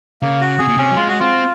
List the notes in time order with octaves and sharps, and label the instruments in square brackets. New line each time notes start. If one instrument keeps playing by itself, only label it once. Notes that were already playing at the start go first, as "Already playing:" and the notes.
[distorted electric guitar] C#3 [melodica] A#3
[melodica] F#4
[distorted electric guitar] C3 [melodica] G#4
[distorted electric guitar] A#2
[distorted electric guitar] C3 [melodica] C#4
[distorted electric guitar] F#3
[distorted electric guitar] G#3 [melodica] F4
[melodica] F#4
[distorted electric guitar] C4 [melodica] F4